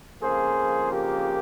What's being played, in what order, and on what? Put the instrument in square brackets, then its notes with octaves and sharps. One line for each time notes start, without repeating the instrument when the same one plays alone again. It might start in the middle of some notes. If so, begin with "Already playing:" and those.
[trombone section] F2 C#3 F3 A#3 G#4 C5
G4 A#4